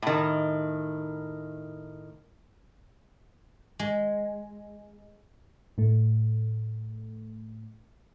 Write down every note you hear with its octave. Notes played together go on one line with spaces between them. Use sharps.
A2 D#3
G#3
A2 A3